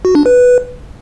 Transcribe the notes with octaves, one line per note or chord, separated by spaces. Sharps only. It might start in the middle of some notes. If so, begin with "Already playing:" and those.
F#4
D4
B4